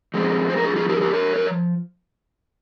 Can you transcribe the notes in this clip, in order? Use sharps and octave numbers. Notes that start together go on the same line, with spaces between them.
F3 G#3 C4
C5
A#4
F4 G#4
F4 G#4
G4 A#4
G#4
G4 A#4
A#4 C#5
A#4